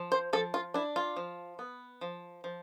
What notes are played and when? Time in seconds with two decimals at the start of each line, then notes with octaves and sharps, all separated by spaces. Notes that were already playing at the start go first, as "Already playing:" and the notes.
Already playing: F3
0.12 C5
0.33 F3 A4
0.54 F4
0.74 D4 E4
0.96 F4
1.16 F3
1.59 B3
2.01 F3
2.44 F3